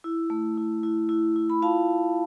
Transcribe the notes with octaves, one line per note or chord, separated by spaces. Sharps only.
E4
A3
E4
E4
E4
E4
B5
F4 F5 A5
F4